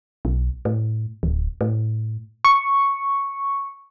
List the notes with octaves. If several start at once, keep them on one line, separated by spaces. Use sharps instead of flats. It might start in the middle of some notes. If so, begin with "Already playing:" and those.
B1
A2
D1
A2
C#6